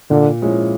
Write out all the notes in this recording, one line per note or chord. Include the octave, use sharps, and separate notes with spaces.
A#2 D3
F3 G#3 C#4 E4